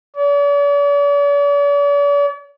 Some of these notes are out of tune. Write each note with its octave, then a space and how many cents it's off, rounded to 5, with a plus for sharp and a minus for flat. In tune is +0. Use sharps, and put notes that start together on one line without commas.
D5 -45